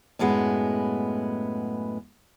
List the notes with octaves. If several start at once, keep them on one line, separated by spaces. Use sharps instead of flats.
F#2 A2 G#3 B3